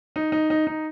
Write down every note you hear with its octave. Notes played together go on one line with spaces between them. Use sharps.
D#4
D#4
D#4
D#4